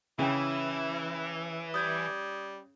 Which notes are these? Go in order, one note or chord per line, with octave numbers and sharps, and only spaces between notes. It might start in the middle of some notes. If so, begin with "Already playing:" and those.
C#3 E3 C#4 E4 G5
G3 D#6 G6 G#6